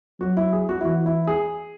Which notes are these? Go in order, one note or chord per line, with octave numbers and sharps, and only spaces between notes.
F#3 F#4
E4
G#4
F#4
E4
E3 F#4
E4
G#4